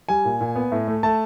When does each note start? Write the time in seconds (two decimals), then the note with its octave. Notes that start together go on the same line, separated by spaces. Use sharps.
0.09 G3 G#5
0.25 A#2
0.41 A#2
0.56 B3
0.72 A2
0.88 A3
1.03 A3 A5